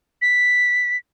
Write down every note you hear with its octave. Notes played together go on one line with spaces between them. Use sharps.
B6